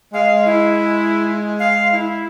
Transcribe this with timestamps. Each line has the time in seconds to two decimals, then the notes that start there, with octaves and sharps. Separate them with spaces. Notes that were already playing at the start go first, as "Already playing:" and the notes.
0.14 G#3 F5
0.45 E4
1.59 F5
1.92 E4